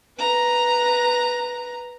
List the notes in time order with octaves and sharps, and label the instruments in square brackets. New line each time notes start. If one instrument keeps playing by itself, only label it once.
[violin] B4 A#5